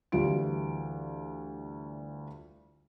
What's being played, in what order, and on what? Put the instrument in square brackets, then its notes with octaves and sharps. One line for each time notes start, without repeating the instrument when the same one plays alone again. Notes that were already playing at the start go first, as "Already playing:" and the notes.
[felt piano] D2 E3 G3 F4 D7